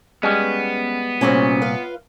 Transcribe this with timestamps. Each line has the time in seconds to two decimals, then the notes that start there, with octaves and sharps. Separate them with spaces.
0.23 G3 G#3 B3 C#4
1.21 C2 A#2 C#4 F#4 C5
1.62 F4 B4 F5